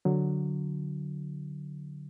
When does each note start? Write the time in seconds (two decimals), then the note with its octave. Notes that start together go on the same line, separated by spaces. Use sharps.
0.05 D3 F#3